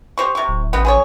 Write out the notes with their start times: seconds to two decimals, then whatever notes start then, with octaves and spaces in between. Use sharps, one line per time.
0.18 G4 C5 C#6
0.35 C3 C#6
0.48 D1
0.73 A1 B3 C4
0.85 G#4 C5 C#5